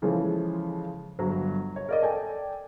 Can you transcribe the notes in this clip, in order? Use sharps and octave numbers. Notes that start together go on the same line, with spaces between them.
C#3 E3 F3 G#3 A4 C#5
G1 F#3
C#5
A#4 D5 D#5
A4 D5 G5 G#5